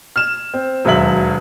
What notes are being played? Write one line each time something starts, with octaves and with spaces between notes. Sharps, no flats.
F6 E7
C4
E1 D#2 F#3 E5 F#7